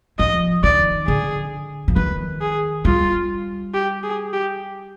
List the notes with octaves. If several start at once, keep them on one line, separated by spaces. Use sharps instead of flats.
F3 D#5
D#3 D5
D3 G#4
F3
D#3 B4
G#4
G3 F4
G4
G#4
G4